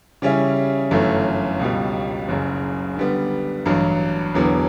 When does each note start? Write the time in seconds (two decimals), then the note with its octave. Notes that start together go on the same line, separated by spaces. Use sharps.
0.22 C#3 G3 C#4 E4
0.91 G1 F#2 E3 A3
1.60 C#2 B2 G3
2.28 F#1 F#2 C#3
2.96 D3 G3 B3
3.66 A1 G2 F#3
4.34 E1 E2 D3 F#3 B3